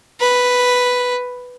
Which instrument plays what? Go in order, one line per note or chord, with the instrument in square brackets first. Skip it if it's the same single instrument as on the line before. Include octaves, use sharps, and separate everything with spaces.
[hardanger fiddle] B4